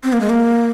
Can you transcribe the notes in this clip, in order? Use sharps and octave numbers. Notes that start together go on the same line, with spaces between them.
C4
A#3
G#3
A#3